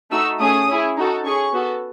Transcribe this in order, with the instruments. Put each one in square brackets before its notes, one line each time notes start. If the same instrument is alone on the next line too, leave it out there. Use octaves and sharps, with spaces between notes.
[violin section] A3 D#4 F#4 E6
A3 C#4 G#4 D#6
C#4 E4 G#4
D#4 F#4 A4
C#4 G#4 C#6
B3 F#4 A4